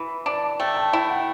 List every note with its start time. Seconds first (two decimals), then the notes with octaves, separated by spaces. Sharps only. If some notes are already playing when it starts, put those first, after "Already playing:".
Already playing: E3 B5
0.26 D4 A5
0.59 A3 G5
0.76 A5
0.93 E4 G5
1.10 F#5